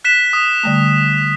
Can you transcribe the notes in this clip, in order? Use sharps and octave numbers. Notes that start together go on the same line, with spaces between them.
F#6 B6 E7
D#6
D3 G3 A3